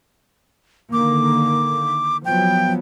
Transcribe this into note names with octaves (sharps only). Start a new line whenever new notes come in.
D3 D#3 A#3 D6
F3 F#3 B3 G5